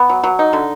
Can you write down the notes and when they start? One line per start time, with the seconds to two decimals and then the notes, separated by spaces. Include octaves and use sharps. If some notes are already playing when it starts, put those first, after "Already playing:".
Already playing: B3
0.09 F#3
0.23 F#3
0.39 D#4
0.53 D3